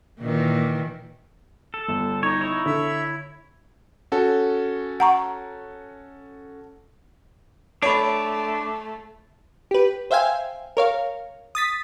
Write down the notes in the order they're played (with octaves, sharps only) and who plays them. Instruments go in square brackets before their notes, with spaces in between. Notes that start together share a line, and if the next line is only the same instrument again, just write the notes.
[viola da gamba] A#2 D#3 E3
[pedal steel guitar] A4
[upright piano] G1
[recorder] D#4 [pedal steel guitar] C#5
[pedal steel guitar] E4 C#5
[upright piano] D3 [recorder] E5
[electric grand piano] C#4 F#4 A4
[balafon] F#5 A#5 C#6
[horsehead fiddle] A3 [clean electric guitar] D4 [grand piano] C#5 B5
[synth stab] G4 B4
C5 E5 F5 G5 G#5
A#4 C#5 F5
D#6 A6 B6